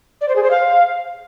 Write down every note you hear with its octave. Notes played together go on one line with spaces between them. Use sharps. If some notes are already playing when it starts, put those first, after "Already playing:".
D5
C5
G#4
C5
F5